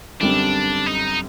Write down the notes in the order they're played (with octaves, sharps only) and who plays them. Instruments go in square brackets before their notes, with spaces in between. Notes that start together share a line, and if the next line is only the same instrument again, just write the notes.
[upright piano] F#2 D3 G3 C4 [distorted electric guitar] D4
[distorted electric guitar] D#4